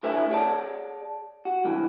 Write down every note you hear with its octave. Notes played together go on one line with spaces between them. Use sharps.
A2 D3 B4 C#5 E5 G#5
G#4 C#5 D5 A5
F#4
C#2 G2 E3